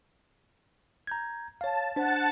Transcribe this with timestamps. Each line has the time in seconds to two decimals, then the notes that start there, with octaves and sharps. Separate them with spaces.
1.07 A#5 G6 G#6
1.61 C#5 F5 A5
1.96 D4 C5 F#5 A5 A6